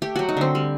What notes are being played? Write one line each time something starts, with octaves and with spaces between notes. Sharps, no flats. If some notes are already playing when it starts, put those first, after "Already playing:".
A3 G4
F#3 F#4
D#4
D3 C4
G3